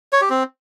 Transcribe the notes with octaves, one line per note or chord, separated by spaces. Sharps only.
C#5
G4
C4